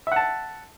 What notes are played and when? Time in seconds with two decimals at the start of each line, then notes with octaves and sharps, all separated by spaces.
0.07 E5
0.12 F#5
0.16 A5